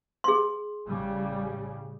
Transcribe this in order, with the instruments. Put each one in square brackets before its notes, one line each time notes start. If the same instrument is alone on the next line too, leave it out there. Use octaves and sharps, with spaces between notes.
[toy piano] G#4 C6
[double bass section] A1 C#3 G3